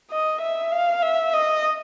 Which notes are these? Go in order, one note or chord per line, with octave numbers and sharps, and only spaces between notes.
D#5
E5
F5
E5
D#5